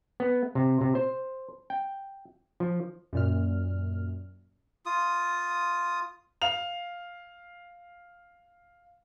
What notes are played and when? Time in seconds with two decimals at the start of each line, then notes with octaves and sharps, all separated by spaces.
0.20 B3
0.55 C3
0.81 C3
0.95 C5
1.70 G5
2.60 F3
3.13 F#2 A#2 F6
4.86 F4 D#6
6.42 F5 F7